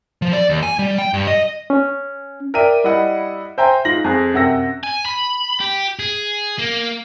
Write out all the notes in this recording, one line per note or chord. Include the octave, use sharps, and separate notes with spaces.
F3
D5
D#2
G#5
G3
G5
G2
D#5
C#4
A#4 D5 E5 G5 D#7
G3 E4 D#5 F#5
C5 E5 G5 G#5 A#5
G#2 F4 A#6 F#7
F2 G#4 F#6
F#2 C3 F#5 G5 E6 A#6
G#5
B5
G4
G#4
A#3